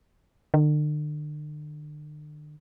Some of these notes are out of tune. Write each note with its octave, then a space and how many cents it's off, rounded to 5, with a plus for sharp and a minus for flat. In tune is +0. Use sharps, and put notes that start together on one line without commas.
D3 +40